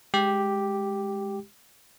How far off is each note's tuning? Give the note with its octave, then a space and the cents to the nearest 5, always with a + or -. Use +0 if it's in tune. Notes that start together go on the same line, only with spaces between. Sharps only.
G#3 +0 G4 +0